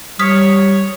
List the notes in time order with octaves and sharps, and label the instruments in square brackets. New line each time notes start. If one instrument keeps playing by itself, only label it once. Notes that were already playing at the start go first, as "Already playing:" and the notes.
[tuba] G3 [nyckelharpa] C#5 [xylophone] D#6 F6 B6